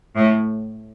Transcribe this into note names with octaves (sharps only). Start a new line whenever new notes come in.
A2